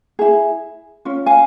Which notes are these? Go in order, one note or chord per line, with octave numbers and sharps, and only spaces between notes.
E4 G#4
C#4 F4
F5 G#5